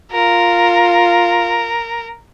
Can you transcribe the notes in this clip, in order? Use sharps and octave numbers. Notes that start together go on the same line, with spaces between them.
F4 A#4